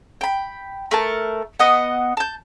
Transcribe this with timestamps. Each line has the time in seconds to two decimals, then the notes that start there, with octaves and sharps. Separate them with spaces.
0.21 G5 B5
0.91 A3 A#4 A5
1.59 B3 D#5 F#5
2.17 A5 G6